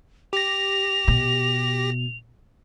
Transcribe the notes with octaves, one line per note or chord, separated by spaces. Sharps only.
G4 A#6 F7
B2